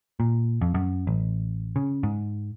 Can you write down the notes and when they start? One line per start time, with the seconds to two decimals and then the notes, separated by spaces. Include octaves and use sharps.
0.20 A#2
0.61 F2
0.74 F#2
1.07 A1
1.76 C#3
2.03 G#2